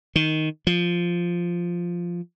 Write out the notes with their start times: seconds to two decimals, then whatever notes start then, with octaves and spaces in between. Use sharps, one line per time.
0.16 D#3
0.67 F3